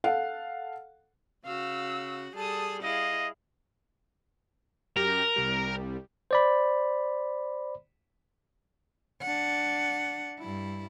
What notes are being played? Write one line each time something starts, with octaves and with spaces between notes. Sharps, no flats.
A4 F5 F#5
C#3 F#4 F5 E6
G3 G#4 A4 A5 D#6
E4 G#4 D#5 F5
F#2 G4 A#4 A#6
C2 G3
C5 D5 B5
D4 F#5
G2 E4